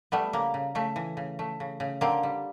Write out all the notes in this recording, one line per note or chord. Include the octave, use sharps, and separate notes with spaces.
G3 A3 B3
C#3 A#3
C#3
C#3 A3
E3
C#3
A3
C#3
C#3
D3 A#3 C4
G3